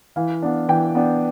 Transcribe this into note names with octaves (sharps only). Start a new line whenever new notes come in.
E3 F5
B3 D4
E3 G5
B3 D4